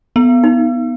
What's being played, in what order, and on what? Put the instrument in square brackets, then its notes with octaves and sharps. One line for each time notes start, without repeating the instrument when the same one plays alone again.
[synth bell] B3
[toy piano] D#4